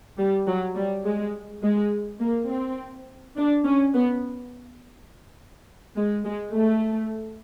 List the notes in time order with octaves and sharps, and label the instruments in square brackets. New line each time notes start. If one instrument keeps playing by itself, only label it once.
[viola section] G3
F#3
G3
G#3
G#3
A#3
C4
D4
C#4
B3
G#3
G#3
A3